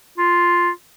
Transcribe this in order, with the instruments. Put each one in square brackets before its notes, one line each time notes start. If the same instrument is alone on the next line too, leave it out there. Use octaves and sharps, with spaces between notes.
[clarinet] F4